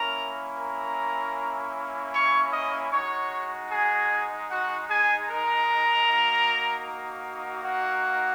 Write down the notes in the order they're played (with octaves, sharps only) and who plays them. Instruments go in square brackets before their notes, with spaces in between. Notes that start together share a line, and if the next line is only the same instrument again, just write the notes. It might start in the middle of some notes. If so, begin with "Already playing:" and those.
Already playing: [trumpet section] A#3 C#4 E4 A#4 A#5
A#4 A#5
C#5 C#6
D#5 D#6
G#3 D#4 F#4 C#5 C#6
G#4 G#5
F#4 F#5
G#4 G#5
A#4 A#5
A#3 D#4 F#4
F#4 F#5